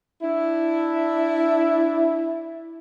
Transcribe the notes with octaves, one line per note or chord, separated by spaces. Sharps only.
D4 E4